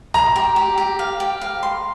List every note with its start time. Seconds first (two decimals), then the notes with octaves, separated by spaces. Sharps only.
0.14 A#5 C6
0.36 G4
0.56 G4
0.78 G4
0.99 F5
1.20 G4
1.41 F5
1.63 C6